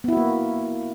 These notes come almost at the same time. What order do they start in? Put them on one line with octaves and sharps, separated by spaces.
B3 E4 F#4 A#3